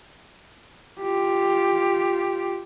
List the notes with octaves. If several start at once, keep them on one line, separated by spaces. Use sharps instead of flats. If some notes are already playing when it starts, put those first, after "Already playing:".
F4 G4